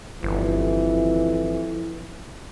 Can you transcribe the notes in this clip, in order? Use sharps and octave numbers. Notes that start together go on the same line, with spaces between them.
G1 F2 E3